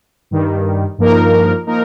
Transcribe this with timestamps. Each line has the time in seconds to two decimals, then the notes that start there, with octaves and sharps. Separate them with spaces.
0.31 G2 D#3 G3
0.98 G2 F3 A#3 D#4 A#4
1.67 F3 A#3 D#4 A#4